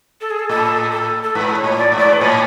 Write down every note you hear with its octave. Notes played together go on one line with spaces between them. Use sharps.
A4
G#4
A4
A2 A4
A4
A4
G#2 B4
C#5
A2
D5
G#2
D5
B4
A2 C#5